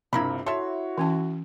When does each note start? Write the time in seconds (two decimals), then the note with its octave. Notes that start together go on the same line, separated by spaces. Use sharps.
0.13 A#1 G2 C3 E4 A#4 B5
0.46 E4 F#4 A4 C#5 E5 C6
0.98 E3 C#4 A5